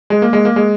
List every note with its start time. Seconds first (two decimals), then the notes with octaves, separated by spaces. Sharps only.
0.10 G#3
0.22 A#3
0.33 G#3
0.45 A#3
0.56 G#3